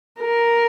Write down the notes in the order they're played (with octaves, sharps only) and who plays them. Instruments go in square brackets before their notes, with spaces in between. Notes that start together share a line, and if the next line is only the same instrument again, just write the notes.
[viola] A#4